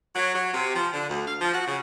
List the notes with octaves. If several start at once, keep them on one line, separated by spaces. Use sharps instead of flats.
F#3
F#3
C3
F3
D3
D2
F5
F3
F#4
C#3